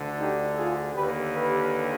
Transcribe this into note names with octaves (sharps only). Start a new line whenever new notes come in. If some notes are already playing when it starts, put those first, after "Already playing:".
Already playing: D2 D3
D#4 G4
F4 G#4
D#2 D3 G4 B4
G4 B4